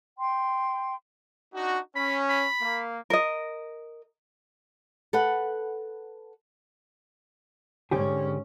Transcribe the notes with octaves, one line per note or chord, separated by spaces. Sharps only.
G5 C6
D4 D#4 F#4
C#4 B5
B5
A#3
A#4 D#5
A4 B4 F#5
G#2 D3 C#4 G4 G#4